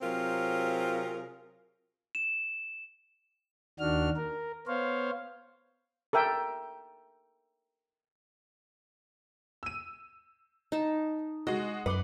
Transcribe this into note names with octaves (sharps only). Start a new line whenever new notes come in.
C3 F#3 C4 F4 G#4 A#4
E7
D#2 D#3 D4 F#4 F6
A#4
B3 C5 C#5 F5
A4 A#4 E5 G5
E6 D#7
D#4 A5
G#3 F#4 D#5
F#2 B4 F#5 C6 D6